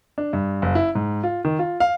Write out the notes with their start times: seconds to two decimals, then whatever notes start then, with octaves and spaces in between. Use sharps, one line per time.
0.18 D4
0.33 G2
0.62 F#1
0.75 E4
0.95 G#2
1.23 F4
1.45 D#3
1.59 F4
1.80 F5